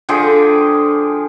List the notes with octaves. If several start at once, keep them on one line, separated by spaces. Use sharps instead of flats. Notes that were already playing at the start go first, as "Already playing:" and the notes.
D3 F3 G#4 G5